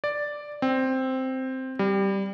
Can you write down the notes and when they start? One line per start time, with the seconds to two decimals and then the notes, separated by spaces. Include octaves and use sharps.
0.04 D5
0.62 C4
1.79 G3